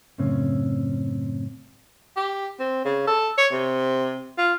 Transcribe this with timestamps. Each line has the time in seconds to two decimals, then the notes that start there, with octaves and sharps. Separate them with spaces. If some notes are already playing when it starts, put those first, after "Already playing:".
0.18 F#2 A2 C#3 C4 C#4
2.16 G4
2.60 C4
2.85 C#3
3.07 A4
3.38 C#5
3.52 C3
4.38 F4